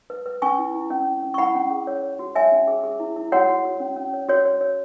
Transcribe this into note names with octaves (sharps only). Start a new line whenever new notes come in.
B4
B4
C#4 G#5 C#6
E4
E4
C#4
C#4
C#4
C#6
E4 F#5 B5
C#4
G#4
C#5
C#5
F#4
C#5 E5 G#5
C#4
G#4
G#4
E4
E4
F#4 C#5 F#5
F#4
F#4
C#4
C#4
C#5
F#4 C#5
C#5
C#5